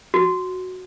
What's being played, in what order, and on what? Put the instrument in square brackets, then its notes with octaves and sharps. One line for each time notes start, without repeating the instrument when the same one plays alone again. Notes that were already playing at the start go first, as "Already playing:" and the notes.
[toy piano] F#4